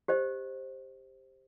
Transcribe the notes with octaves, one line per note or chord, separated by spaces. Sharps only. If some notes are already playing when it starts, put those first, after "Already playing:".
G4 C5 D#5